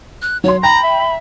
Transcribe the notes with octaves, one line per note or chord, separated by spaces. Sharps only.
F#6
F#3 C#5 C6
G5 A#5 B5
E5
E5